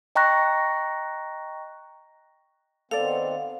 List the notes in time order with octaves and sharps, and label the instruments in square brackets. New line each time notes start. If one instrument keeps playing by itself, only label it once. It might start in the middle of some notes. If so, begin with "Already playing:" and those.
[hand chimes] D#5 G5 A#5 C#6 F#6 A#6
[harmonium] D#3 B3 C4 [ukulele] A4 D5 [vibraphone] F5